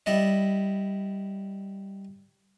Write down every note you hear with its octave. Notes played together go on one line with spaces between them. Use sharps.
G3 E4 D5 D#5